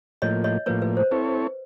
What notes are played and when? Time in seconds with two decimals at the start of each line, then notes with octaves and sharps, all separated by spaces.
0.22 A2 F3 A#3 C#5 D#5
0.44 C#5 D#5
0.66 A2 F3 A#3 B4 C#5
0.82 B4
0.97 C5
1.11 C4 E4 A4 B4 C#5